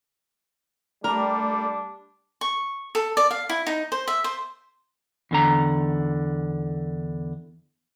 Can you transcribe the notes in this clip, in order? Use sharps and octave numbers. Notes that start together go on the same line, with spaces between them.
G3 A3 D4 A#4
C#6
A4
D5
F5
E4
D#4
C5
E5
C5
E2 D3 A#5